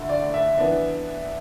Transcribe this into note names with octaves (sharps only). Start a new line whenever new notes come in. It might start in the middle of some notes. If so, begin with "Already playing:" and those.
Already playing: D2 D3 A3 E4
D5
E5
E3 B3 D4